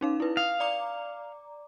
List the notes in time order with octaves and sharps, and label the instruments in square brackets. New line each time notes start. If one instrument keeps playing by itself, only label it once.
[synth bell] C#4 D#4 F5
E4 B4
[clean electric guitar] F5 [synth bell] D#6
[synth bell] D5 A#5 D6